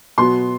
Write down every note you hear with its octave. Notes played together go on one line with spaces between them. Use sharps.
B2 F#3 B3 C6